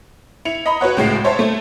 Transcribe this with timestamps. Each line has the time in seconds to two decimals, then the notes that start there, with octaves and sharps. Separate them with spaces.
0.45 E4 C#7 F7
0.66 D#5 A#5 B5
0.81 F#4 B4 C#5 F#5
0.97 C#2 A2 G#3 C7
1.24 C5 C#5 E5 A5
1.39 A3